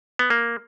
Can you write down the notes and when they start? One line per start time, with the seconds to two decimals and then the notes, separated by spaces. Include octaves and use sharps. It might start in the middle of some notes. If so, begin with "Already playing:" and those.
0.19 B3
0.30 A#3